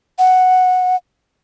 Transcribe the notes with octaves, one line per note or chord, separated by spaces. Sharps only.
F#5